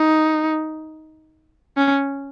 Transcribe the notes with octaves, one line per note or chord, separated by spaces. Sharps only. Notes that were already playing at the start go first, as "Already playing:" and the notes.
Already playing: D#4
C#4